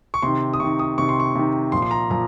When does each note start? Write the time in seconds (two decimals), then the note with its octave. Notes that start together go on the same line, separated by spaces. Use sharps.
0.14 C#6
0.22 C3 D#3 C6
0.53 D#6
0.60 C3 D#3 C#6
0.79 D#6
0.98 C3 D#3 C#6
1.09 C6
1.20 C#6
1.35 C3 D#3
1.72 A#2 F3 C6
1.82 C6
1.91 A#5
2.10 A#2 F3 A#5